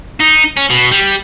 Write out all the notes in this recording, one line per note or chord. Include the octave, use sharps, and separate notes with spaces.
D#4
C#4
B2
G3